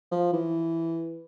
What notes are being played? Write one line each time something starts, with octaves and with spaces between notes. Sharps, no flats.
F3
E3